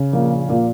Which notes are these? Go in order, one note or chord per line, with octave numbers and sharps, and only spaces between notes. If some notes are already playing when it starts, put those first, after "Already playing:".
Already playing: C#3
A#1 A#3
A#2 A#3